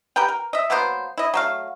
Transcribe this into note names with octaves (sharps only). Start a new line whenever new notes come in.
G4 A#4 B4 G5
A#4
D#5 E5
F#3 A#3 B3 C5
E4 D#5
F#3 A3 F5